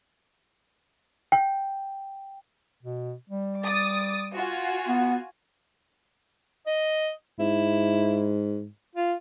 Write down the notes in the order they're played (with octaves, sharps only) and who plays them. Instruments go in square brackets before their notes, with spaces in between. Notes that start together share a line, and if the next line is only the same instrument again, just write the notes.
[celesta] G5
[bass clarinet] B2
G3
[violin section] D6 D#6 A6
F4 F#4 G#5
[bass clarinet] B3
[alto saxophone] D#5
[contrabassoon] G#2 [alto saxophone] E4
[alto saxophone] F4